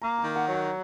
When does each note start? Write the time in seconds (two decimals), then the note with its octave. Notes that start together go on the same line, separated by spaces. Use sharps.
0.02 A#3 A#5
0.18 A#5
0.24 D#3
0.36 F#5
0.48 F#3 F#5